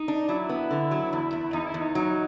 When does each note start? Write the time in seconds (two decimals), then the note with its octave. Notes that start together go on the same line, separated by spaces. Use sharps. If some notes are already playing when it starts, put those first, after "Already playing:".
Already playing: D#4
0.08 D4
0.28 F#3 E4
0.49 B3
0.71 D3
0.91 F#3
1.12 E2 E4
1.33 E2
1.53 E2 D#4
1.67 E4
1.74 E2
1.80 D#4
1.95 F#3